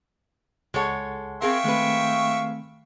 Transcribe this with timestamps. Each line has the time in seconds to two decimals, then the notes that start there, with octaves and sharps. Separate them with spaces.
0.74 C#2 G#3 A4 C#5 F#5
1.42 C4 G#4 A#4 E5 F5 G5 C#6
1.64 D#3 G#3 A3 C4 B4